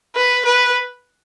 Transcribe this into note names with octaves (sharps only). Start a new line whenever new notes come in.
B4
B4